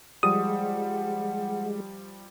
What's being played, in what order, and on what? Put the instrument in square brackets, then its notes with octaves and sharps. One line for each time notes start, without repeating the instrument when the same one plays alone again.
[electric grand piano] F3 G3 [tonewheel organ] G#3 [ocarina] F#5 [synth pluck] D#6